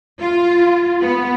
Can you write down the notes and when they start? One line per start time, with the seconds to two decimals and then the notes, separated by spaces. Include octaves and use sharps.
0.21 F4
1.01 B3